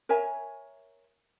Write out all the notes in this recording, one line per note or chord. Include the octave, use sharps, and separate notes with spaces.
A#4 C#5 E5 G#5